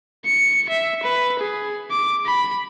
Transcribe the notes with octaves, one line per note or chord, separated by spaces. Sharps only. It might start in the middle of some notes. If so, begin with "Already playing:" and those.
C#7
E5
B4
G#4
D6
B5